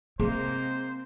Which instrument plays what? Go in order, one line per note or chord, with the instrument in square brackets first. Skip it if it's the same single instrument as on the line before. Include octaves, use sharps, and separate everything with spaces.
[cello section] C3 G#3 A#3 [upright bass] C4 [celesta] G#4 [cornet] C5